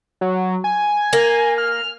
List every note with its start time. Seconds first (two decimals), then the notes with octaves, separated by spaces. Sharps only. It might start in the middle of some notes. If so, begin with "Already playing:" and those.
0.21 F#3
0.64 G#5
1.13 A#3
1.58 F6